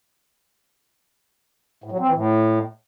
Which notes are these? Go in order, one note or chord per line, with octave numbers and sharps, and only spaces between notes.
A2
F#3
C4
E3
A2